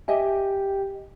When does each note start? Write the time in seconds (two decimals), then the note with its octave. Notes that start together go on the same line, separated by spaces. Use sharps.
0.08 G4 D#5 E5 G#5